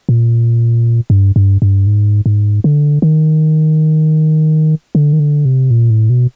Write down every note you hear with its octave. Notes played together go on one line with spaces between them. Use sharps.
A#2
G2
G2
G2
G#2
G#2
D3
D#3
D3
D#3
D3
C3
A#2
A2
B2